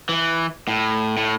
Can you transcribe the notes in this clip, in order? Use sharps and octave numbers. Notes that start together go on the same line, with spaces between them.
E3
A2
A2